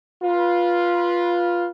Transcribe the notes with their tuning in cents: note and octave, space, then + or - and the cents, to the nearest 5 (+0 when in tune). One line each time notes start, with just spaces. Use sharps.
F4 +0 B4 -20